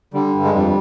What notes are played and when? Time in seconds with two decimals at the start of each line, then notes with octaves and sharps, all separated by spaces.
0.14 D3 G3
0.34 G2
0.44 G#3
0.54 F2 G3